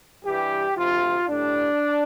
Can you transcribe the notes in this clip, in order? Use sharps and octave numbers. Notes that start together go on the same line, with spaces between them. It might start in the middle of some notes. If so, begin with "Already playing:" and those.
G2 E3 G3 G4
D2 C3 F3 F4
A2 G3 D4